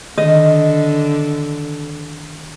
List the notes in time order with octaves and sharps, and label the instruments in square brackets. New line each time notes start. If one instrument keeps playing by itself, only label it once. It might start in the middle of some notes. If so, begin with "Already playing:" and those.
[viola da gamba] D3 [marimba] D#3 [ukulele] D#5